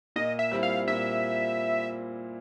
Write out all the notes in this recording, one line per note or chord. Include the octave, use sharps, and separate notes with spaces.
A#2 D#5
E5
G3 C4 E4
F5
A#2 E5